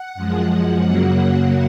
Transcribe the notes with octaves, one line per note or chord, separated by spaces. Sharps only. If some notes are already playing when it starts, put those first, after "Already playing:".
Already playing: F#5
F#2 F3 G#3
F#2 C#3 F#3 A#3 F#5